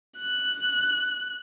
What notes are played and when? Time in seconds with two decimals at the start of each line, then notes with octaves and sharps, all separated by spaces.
0.17 F#6